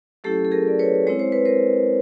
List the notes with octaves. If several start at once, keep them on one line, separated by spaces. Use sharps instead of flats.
F#3 A3 C#4 E4 G4 A4
A4
G#4 A#4
D5
B4 C#5
G#3 C4 E4 C#5
C5
B4
A#4 C5